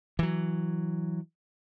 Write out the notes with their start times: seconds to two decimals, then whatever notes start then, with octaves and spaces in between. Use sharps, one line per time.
0.19 E3 F#3